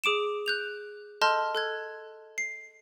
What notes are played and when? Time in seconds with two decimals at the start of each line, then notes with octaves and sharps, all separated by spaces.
0.04 G#4 D6 D7 E7
0.46 F#6 G6 F7
1.21 A4 D#5 A5 C6 F6 G6
1.55 A4 F#6 G#6
2.38 C7